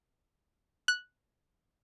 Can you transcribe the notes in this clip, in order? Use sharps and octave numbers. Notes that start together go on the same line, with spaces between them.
F#6